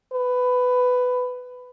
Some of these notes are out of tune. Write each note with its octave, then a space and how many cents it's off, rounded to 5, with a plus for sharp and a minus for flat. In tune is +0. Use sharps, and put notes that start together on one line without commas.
B4 +15